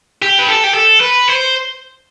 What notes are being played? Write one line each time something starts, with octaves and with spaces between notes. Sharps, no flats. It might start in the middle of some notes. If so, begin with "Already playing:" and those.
G4
B4
A4
G4
A4
B4
C5